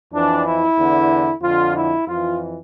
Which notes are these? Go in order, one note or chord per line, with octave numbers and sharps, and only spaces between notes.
F2 E3 D4
E4
E2 D3
F2 D3 F4
E4
F2 E3 F4